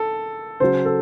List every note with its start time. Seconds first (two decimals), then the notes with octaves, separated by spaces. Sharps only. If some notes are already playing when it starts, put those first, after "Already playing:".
Already playing: A4
0.60 C#3 F#3 C5
0.85 A4